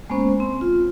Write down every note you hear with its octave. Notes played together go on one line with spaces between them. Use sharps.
G#3 A#3 B3 C#4 C5
C4
F4